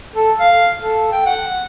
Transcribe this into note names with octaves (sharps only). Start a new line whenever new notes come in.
A4
F5
A4
G5
F#5